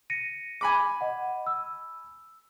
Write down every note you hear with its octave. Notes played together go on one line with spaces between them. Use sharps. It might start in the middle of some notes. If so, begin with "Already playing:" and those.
A#6 C#7 D#7
G#5 B5 D6
D#5 F#5
E6